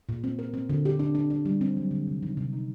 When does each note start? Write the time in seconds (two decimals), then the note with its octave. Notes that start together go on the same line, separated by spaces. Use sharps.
0.09 A#2
0.24 C4
0.39 A#4
0.54 C4
0.69 D3
0.85 G4
0.99 D4
1.15 D4
1.30 D4
1.46 G3
1.61 C4
1.77 F#3
1.91 D3
2.07 C3
2.23 D#3
2.37 C3
2.53 D#4